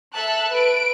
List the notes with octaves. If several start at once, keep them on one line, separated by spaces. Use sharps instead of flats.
A4 E5 A5 F#6
B4 D7